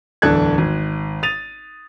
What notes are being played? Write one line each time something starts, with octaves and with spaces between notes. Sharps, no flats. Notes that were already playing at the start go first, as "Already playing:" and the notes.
D1 E2 D4 A4 F#6 G#6
G#1
D#6 A6 D#7 F7